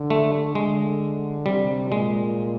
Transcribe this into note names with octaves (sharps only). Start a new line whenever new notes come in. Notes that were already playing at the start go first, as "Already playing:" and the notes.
Already playing: D3
A3
D3 G#3
C3 G3
A#2 G#3